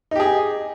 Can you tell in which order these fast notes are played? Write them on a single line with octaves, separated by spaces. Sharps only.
D#4 G4 G#4